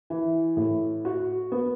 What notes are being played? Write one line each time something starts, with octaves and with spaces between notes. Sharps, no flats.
E3
A2
F#4
B3